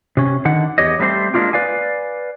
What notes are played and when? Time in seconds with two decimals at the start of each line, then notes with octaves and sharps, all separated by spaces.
0.17 C3 C#4
0.45 D3 D#3 F#5
0.78 E2 G4 C#5 D#5
1.00 G3 A3 C4 G#4 C5
1.34 G#3 A#3 D4 D#4 F4 G4
1.53 B4 D5 F5 G#5